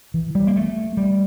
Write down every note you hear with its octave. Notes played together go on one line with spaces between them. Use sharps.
E3
G3
A#3
A3
G3